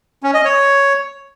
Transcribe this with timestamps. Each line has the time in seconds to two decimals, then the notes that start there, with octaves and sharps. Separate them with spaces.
0.23 C#4
0.34 D#5
0.45 C#5